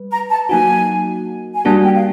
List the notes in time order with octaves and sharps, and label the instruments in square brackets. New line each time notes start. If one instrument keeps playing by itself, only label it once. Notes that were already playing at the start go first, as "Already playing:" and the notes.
Already playing: [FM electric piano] G3 B4
[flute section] A#5
A5
[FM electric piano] F#3 A#3 D#4 F#4 [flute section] G#5
[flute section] G#5
[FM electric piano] G3 A#3 D4 F#4 [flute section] A5
[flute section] G5
F5